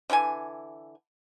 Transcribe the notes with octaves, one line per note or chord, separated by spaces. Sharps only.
D3 E3 E5 G#5